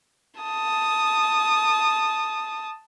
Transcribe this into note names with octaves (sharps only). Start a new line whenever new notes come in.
A5 D#6